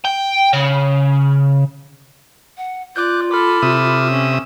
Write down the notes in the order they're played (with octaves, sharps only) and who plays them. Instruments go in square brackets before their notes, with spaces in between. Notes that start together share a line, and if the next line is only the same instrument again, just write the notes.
[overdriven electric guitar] G5
C#3
[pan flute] F#5
[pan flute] F4 [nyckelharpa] D5 [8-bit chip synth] D6 F#6 G6
[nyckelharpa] A4 B5 [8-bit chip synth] D6 F6
[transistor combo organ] C3 E5 D#6
[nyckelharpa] C#4